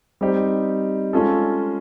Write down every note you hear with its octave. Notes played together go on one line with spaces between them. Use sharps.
G3 C4 D#4 G4
G#3 C#4 F4 A4